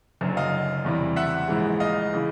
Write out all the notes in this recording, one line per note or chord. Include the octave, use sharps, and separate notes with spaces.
F#1 F#2 D3 F#3
D#5 F5
E2 C3 E3 G3
E5 F#5
A#1 G#2 E3 G#3
D#5 F5
C#3 E3